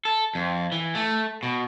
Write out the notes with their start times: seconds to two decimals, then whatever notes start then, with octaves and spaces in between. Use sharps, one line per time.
0.05 A4
0.35 F2
0.72 E3
0.95 A3
1.43 B2